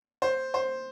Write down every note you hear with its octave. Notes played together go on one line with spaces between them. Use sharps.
C5
C5